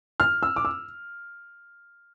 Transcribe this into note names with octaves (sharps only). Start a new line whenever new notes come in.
F6
E6
D6
E6